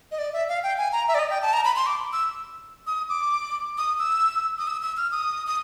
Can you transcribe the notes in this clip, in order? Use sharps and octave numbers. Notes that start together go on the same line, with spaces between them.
D#5
D5
E5
F5
G5
G#5
A#5
E5
D5
D#5
G5
A5
A#5
B5
C6
D6
E6
D#6
D6
D#6
E6
D#6
E6
E6
F6
D#6
D#6